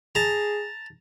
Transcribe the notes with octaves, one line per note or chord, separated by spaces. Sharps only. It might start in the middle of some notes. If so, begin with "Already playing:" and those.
G#4 A5 A#5